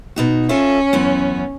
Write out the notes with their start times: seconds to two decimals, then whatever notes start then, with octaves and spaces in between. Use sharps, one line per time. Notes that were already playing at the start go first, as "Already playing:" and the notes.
0.16 B2 D#4 F#4
0.49 C#4 F4 A4 E5
0.93 F#2 E3 B3